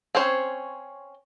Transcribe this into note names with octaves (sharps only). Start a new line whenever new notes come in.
C4 C#4 C5 C#5